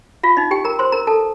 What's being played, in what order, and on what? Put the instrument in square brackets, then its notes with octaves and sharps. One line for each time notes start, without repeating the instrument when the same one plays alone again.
[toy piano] F4 F5
D#4 D#5
G4 G5
A#4 A#5
C5 C6
A#4 A#5
A4 A5